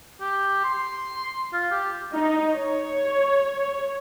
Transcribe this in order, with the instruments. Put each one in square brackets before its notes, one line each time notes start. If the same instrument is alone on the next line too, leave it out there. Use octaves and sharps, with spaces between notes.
[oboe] G4
C6
F4
G4
[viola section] D#4
C#5